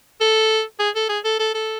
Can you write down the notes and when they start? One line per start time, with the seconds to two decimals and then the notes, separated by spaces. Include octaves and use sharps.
0.20 A4
0.79 G#4
0.95 A4
1.09 G#4
1.25 A4
1.39 A4
1.54 A4